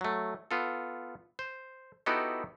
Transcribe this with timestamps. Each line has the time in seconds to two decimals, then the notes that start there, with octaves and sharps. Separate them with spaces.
0.01 F#3 A3
0.51 B3 F4 A4
1.39 C5
2.06 B3 D#4 E4 F#4 G4 A4